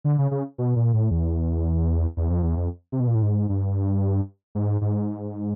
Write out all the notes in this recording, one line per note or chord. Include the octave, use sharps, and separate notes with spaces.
D3
C#3
C#3
B2
A#2
A2
E2
E2
F2
E2
F2
C3
B2
A#2
A2
G#2
G2
G#2
G#2